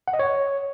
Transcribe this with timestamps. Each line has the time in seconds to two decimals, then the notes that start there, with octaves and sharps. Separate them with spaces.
0.08 F#5
0.14 D#5
0.19 C#5